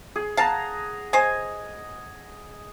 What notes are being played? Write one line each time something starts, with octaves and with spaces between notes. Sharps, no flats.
G#4
F5 F#5 A5 A#5
C5 D#5 G#5